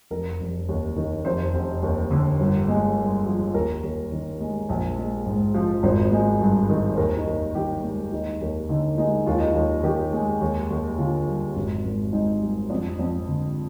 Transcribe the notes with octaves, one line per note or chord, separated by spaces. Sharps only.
F1 A#4
F1
D#2
D#3
F1 C5
F1
D#2
D3
G1
G#3
G2
F3
D#2 A#4
D#2
D#3
G#3
A#1
G#3
G#2
F3
G#1 C5
G#3
G2
D#3
C5
D#2 A#4
D#4
D#2
D#3 G4
G#3
D#2 D#4
D#2
D3 D#4
G#3 D#4
D#2 F4
D#4
D#2 F4
D#3 G4
G#3
D#2
D#2
D3 F4
G3
G#1
G#1
G#2 D#4
G3
F2 D4
F2
D3